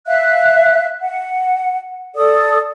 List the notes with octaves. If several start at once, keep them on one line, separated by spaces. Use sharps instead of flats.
E5 F5 F#6
F#5
A4 D5 D#6